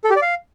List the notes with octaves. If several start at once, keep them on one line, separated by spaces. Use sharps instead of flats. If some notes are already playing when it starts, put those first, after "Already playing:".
A4
G4
D5
F5